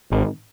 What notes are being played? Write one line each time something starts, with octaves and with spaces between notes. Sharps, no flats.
G#1